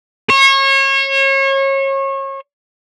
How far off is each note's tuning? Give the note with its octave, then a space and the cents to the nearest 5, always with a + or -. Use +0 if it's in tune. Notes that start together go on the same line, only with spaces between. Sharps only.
C#5 -30